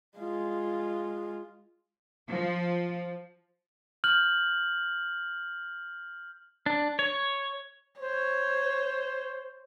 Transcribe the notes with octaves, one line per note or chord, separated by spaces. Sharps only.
G#3 F4
F3
F6 G6 F#7
D4
C#5
C5 C#5